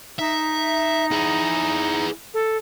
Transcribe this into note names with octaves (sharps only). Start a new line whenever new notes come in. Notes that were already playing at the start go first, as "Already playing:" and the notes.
D#4 E5
E4 G#4
A4